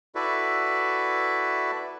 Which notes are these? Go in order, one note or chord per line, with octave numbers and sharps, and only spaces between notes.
E4 F#4 A4 B4 D5 E5